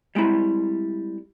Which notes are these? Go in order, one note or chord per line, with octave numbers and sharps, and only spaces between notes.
G3 G#3 C4 E4 A#5